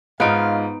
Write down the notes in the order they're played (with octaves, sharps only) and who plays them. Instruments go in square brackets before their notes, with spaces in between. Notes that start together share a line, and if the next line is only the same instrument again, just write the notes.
[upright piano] G#2 F4 D7 [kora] B3 D#4 [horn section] F5